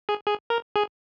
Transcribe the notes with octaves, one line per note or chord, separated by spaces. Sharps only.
G#4
G#4
A#4
G#4